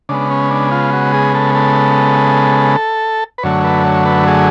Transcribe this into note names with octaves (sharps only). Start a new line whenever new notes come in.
C#3 G#3 B3 D4
C#4
D4
F4
F#4
G#4
A4
A4
B4
F#2 D3 F#3 A3 C#5
B4
C#5
B4
G#4